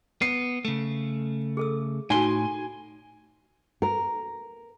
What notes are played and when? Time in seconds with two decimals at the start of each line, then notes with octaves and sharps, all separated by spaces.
0.22 B3 C7
0.65 C#3 A3
1.57 G#4 A4 E6
2.10 A2 D#4 F#4 G#5 C6
3.82 A#4